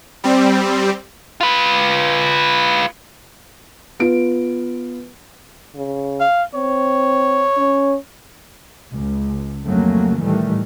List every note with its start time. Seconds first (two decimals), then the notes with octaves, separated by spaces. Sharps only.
0.24 G3 C4
1.41 F4 B4
4.00 B3 F4 D7
5.75 C#3
6.20 F5
6.55 C4 C#5
7.57 C#4
8.93 C#2
9.66 F2 C#3 F#3 A3 A#3
10.21 A2 D#3 E3 G3 A3